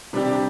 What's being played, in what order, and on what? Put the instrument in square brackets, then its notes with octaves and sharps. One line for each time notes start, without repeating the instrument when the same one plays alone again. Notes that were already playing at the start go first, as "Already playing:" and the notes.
[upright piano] C3 G3 D4 G4